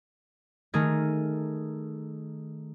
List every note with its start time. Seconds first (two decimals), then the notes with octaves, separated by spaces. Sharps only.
0.74 D#3 A3 G#4 A#4